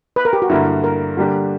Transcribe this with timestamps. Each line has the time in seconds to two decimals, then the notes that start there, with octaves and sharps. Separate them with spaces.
0.16 B4
0.25 A#4
0.33 G4
0.42 F#4
0.49 G2 D3 A#3 E4
0.84 A#4
1.17 D3 G3 A#3 D4 G4